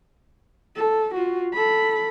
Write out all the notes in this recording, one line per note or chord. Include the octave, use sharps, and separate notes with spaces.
A4
F4 F#4
A4 B5